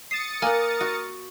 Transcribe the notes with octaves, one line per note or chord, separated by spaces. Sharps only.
D#6 A6 C7 C#7 E7
A#3 A#4 F#5 G#5 F6
F#4